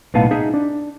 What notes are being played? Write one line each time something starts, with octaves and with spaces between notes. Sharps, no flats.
B1 A2 B3 D#4 F5 A5
D#4 G#4 E5
D4